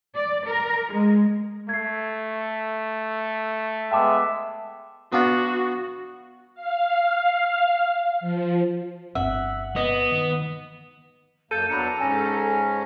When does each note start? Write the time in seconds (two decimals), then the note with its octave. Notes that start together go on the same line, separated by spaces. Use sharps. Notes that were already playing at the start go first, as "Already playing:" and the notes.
0.16 D5
0.48 A#4
0.93 G#3
1.69 A3 G#6 C7
3.91 G#3 B3 E5 G5 A5 D6
5.12 B3 D4 F4 F#4
6.55 F5
8.20 F3
9.15 G1 G2 C4 E5 F#5
9.76 B3 D#5
10.12 D#3
11.51 F#2 A#3 A4 G6 D#7
11.70 E2 F#3 D4 A#5 B5 C#7
12.00 G#2 C#4 G#5 A5 A#6